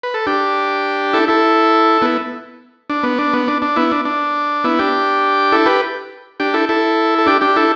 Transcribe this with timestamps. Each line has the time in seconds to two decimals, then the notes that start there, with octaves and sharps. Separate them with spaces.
0.03 B4
0.14 A4
0.27 D4 G4
1.13 E4 A4
1.28 E4 A4
2.02 B3 E4
2.90 D4
3.03 B3
3.19 D4
3.33 B3
3.48 D4
3.62 D4
3.76 B3 E4
3.92 D4
4.05 D4
4.64 B3 E4
4.79 D4 G4
5.52 E4 A4
5.66 G4 B4
6.40 D4 G4
6.54 E4 A4
6.69 E4 A4
7.18 A4
7.26 D4 G4
7.41 D4 G4
7.56 E4 A4